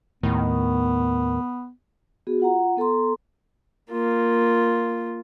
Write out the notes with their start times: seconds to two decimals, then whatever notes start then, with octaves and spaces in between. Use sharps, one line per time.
0.23 D#2 A2 D#3 B3
2.27 B3 F#4 G#4
2.40 F4 F#5 A#5
2.77 B3 A4 A#5 C6
3.90 A#3 F4